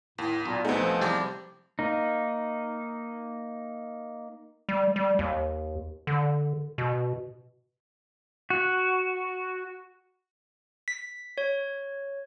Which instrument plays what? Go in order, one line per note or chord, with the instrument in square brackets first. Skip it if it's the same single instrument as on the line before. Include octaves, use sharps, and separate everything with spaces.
[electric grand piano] D#2 [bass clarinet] A2
[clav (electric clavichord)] B1 [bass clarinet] A#2
[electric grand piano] C2 D#4 [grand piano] A3 B3 C4
[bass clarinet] F3
[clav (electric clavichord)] E2 G4 D5 [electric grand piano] C3 G3
[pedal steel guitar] A#3 D#4
[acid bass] G3
G3
D#2
D3
B2
[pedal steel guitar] F#4
[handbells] B6
C#5